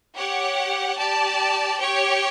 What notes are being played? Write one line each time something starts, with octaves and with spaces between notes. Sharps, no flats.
G4 C#5 F#5
G4 D5 A5
G4 C#5 G5